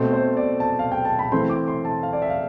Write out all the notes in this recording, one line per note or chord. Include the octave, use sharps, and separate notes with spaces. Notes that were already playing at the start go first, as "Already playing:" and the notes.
Already playing: B2 A3 C4 C5
C5
D5
A5
F5
G5
A5
B5
E3 A3 C4 C6
D6
C6
A5
F5
D5
E5
F5